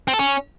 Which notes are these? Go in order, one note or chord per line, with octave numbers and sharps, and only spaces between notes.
C4
A4
C#4